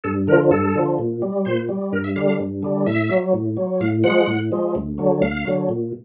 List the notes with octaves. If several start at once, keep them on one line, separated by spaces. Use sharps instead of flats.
G2 A4
D3 F3 A#4
G2 A4
D3 F3
A#2
G3
A#2 C5
G3
G2 A#4
E5
D3 G3 F5
F5
G2
D3 G3
A2 E5
F#3
A2
F#3
A2 F5
F3 G#3 F#5
A2
F3 G#3
D2
D3 F#3
D2 F5
D3 F#3
A#2